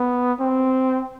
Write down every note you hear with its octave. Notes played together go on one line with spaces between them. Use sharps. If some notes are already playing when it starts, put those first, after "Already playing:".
Already playing: B3
C4